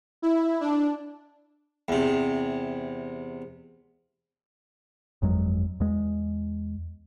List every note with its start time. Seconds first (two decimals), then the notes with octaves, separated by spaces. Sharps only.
0.22 E4
0.61 D4
1.88 E2 C3
5.22 G1 F2 F#3 G#3
5.80 E2 G#3